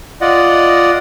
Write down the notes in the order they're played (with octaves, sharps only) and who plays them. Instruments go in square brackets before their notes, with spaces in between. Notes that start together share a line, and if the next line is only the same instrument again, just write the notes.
[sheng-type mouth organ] F4 D5 D#5 F#5